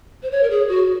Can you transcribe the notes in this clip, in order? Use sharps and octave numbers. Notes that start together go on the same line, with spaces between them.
C5
C#5
A#4
G#4
F#4